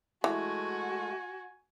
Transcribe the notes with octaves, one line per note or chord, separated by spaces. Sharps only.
E3 G#3 A3 F#4 G#5